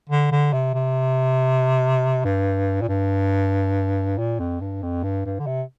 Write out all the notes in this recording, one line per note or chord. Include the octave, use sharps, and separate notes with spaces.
D3
D3
C3
C3
G2
A#2
G2
A#2
F2
G2
F2
G2
G2
D3
C3